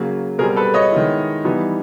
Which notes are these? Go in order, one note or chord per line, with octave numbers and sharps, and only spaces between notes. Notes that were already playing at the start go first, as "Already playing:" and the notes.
Already playing: C#3 F#3 A#3
B2 G3 C4 G#4 A#4
A4 B4
C#5 D#5
D#3 G#3 B3 E4
E3 G3 B3 D#4